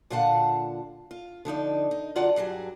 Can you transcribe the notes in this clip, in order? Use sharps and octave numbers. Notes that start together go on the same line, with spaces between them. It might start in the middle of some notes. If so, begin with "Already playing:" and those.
A#2 D3 F4 F5 F#5 A5
F4
D3 F3 D#4 D5
D#4
F#2 D3 F#3 F4 D5 F#5
G2 F#3 G4 G#4